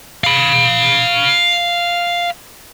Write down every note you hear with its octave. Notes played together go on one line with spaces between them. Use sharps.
F5 B5